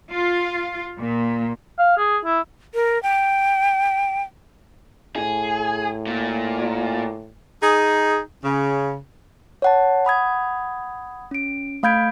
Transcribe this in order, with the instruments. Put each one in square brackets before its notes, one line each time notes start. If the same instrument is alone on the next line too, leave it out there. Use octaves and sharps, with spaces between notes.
[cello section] F4
A#2
[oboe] F5
G#4
E4
[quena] A#4
G5
[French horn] A2 [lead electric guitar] G#4
[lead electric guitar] A#2
[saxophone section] D#4 G#4
C#3
[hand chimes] C#5 F#5 A5
F#5 B5 D#6 G#6
C#4 D7
A3 F5 B5 G6 G#6 D7